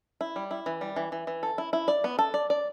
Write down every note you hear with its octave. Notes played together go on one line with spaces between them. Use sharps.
E4
G3
E4
E3
G3
E3
E3
E3
A4
E4
E4
D5
B3
A4
D5
D5